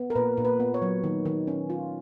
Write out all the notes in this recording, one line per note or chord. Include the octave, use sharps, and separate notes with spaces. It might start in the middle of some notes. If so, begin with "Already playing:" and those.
Already playing: B3
A#4
A#2 B4
A#2
B4
B3
C#5
F#3
D#3
D#3
C#4
F4